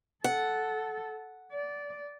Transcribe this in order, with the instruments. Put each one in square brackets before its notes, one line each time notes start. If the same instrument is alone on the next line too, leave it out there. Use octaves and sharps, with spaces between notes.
[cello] A4 [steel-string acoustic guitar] F#5
[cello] D5